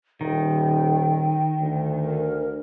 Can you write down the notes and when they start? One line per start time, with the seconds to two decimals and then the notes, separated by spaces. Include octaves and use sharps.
0.21 D#1 D#3 G5
1.60 D2
2.02 A#4